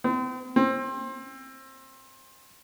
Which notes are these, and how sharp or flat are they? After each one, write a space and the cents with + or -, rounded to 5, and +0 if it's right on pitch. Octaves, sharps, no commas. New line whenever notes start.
C4 -40
C4 +25